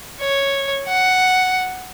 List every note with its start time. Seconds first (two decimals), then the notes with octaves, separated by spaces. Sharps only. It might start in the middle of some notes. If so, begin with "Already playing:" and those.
0.19 C#5
0.87 F#5